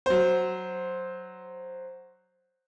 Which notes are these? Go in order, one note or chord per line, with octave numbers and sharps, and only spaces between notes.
F#3 C5